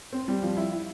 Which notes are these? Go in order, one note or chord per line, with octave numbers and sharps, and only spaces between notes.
C4
G3
F3
E4
E4